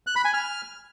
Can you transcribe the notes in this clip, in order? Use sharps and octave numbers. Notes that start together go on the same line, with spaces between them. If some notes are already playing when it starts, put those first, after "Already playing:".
F#6
B5
G#5
F6